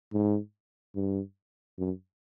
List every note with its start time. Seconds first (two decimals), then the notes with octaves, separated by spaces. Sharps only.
0.13 G#2
0.95 G2
1.78 F#2